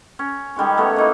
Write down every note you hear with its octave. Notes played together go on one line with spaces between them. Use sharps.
C#4
D#3 G3 G#3 C#4
A3 B3 C#5
A#3 D#4 E4